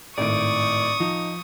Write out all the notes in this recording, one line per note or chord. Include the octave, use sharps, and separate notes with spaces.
G#1 A2 D5 C#6 D#6 D7
F3 D#4